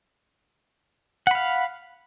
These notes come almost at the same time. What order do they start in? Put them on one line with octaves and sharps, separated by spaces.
F#5 B5 F5